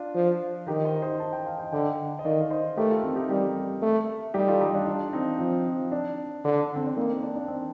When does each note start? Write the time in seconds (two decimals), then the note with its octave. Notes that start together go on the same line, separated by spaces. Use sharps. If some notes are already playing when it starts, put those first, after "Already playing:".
Already playing: D4 F4
0.15 F3
0.67 D#3 D#4 G4
0.85 C5 D#5
1.02 C5 D#5
1.20 A5
1.33 G5
1.46 F5
1.58 D#5 G5
1.72 D3 D#5 G5
2.19 D#5
2.25 D#3 D5 F5
2.40 F5
2.50 C5 D#5
2.77 A3 G4 A#4
2.90 F4 A4
3.03 C4 D#4
3.16 D#4 G4
3.29 G3 G4 A#4
3.82 A3
4.34 G3 D#4 G4
4.48 F4 A4
4.61 D#4 G4
4.74 D4 F4
4.87 D4 F4
5.13 C4 D#4
5.39 F3 C4
5.92 D4
6.44 D3 D4
6.76 C4
6.86 D4
6.96 A#3 C4 D#4
7.09 C4
7.23 D4
7.36 D4
7.48 C4